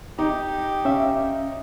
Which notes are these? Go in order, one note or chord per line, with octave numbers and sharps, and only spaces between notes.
D#4 G4
C#4 E5 F5